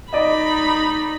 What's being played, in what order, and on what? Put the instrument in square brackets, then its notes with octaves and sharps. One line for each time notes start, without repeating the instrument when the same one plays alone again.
[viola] D#4 B5 [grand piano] D5 D#5